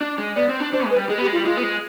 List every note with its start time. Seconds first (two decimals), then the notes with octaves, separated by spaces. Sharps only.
0.01 D4
0.18 G#3
0.36 B3 D5
0.49 C4
0.60 D4
0.73 D4 C5
0.85 G#3
0.91 B4
0.96 G3
1.09 G#3 G#4
1.18 B3 G4
1.27 G#3
1.32 F4
1.36 G3
1.45 G#3 F4
1.57 B3
1.63 G#3